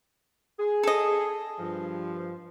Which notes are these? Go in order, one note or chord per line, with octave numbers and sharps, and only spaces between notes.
G#4
A4 D#5
G2 F3